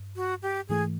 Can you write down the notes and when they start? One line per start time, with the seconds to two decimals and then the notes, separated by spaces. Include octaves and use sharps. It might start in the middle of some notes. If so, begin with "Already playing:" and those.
Already playing: G2
0.16 F#4
0.42 G4
0.69 G#2 E3 A3 G#4